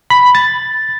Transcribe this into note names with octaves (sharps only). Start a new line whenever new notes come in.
B5
A6